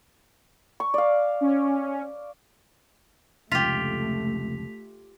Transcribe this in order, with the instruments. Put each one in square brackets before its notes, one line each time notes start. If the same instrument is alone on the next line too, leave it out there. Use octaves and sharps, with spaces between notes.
[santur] C#6
D5 F5
[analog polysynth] C#4
[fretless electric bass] F1 C#2 [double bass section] A3 [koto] F4 G4 [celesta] B6 F7